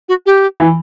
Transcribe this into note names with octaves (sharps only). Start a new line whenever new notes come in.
F#4
G4
E3